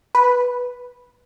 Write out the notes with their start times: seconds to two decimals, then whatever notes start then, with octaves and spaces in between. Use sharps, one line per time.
0.15 B4